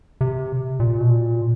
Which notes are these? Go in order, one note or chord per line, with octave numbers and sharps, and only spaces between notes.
C3
A#2
B2
A#2